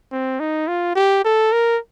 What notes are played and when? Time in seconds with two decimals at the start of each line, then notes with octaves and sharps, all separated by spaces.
0.12 C4
0.40 D#4
0.68 F4
0.96 G4
1.25 A4
1.52 A#4